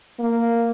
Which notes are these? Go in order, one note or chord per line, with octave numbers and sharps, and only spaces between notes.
A#3